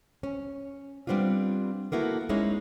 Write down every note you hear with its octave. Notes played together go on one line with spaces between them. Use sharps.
C#4
G3 B3 C4 D4 F4
A#3 B3 E4 F#4 A4
G#3 A#3 C#4 D#4 E4